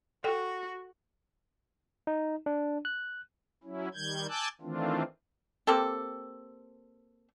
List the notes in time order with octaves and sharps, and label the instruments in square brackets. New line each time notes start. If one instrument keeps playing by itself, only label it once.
[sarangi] F#4 [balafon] A4 G5
[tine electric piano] D#4
D4
F#6
[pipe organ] F#3 C#4 E4
D#3 G3 G6 G#6
G#5 A5 D6 E6 F#6 G6
D#3 E3 A3 C4 D4 F4
[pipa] A#3 C4 G4 A4